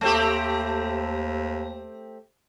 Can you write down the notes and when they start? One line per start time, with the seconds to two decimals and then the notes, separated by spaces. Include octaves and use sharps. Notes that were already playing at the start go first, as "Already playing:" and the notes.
0.01 D#2 A3 C4 G4